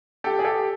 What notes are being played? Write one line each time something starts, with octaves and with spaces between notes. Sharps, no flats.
G4 A4
G#4
G4 A4